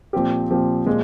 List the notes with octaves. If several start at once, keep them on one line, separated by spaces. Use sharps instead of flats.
A#2 F3 C4 G4
A#2 F3 C4 G4
A#2 F3 G#3